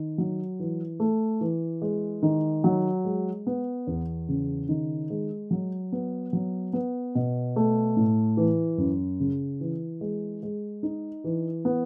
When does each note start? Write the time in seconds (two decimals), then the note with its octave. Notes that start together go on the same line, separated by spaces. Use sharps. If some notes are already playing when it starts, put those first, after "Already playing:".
Already playing: D#3
0.18 F#3
0.60 E3
1.00 A3
1.41 E3
1.82 G#3
2.23 D#3
2.64 F#3
3.05 G#3
3.47 B3
3.87 E2
4.29 C#3
4.69 D#3
5.10 G#3
5.51 F#3
5.92 B3
6.33 F#3
6.73 B3
7.15 B2
7.56 A3
7.96 A2
8.37 E3
8.78 F#2
9.20 C#3
9.61 E3
10.01 G#3
10.43 G#3
10.83 D#4
11.24 E3
11.65 B3